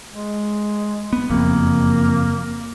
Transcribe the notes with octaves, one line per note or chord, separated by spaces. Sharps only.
G#3
B3
F#1 F2 A#3